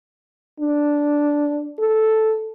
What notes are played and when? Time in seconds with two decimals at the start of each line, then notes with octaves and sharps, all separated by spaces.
0.60 D4
1.79 A4